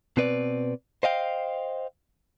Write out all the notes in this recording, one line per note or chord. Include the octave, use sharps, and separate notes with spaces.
B2 C4 B4 D5
C5 D#5 F5 G5